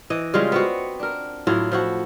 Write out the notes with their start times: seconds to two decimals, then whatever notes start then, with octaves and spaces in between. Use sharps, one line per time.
0.10 E3 D#5
0.34 C#3 G3 G#3 F4
0.52 B3 C4 F#4
1.00 D4 A#4
1.47 A2 F#3 E4 F4
1.72 F3 E4 F#4